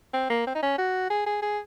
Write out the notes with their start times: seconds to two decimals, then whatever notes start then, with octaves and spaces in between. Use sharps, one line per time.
0.14 C4
0.30 A#3
0.47 C4
0.55 D#4
0.63 C#4
0.78 F#4
1.10 G#4
1.26 G#4
1.42 G#4